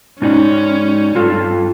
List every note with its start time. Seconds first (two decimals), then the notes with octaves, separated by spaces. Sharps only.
0.22 G#2 C#4 D#4 D5
1.15 G2 F4 A4